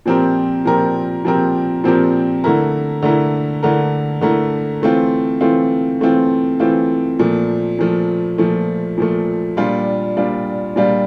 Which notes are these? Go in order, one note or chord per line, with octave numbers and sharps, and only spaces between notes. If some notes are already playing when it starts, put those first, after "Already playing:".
A#2 F3 C4 G4 A#4
A#2 F3 C4 G4 A#4
A#2 F3 C4 G4 A#4
A#2 F3 C4 G4 A#4
D3 A3 E4 A#4
D3 A3 E4 A#4
D3 A3 E4 A#4
D3 A3 E4 A#4
E3 A3 C4 F4
E3 A3 C4 F4
E3 A3 C4 F4
E3 A3 C4 F4
A#2 F3 A3
A#2 F3 A3
A#2 F3 A3
A#2 F3 A3
A#2 G3 D4 F4
A#2 G3 D4 F4
A#2 G3 D4 F4